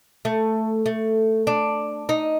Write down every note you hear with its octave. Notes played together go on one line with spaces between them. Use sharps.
A3
A3
D4
D#4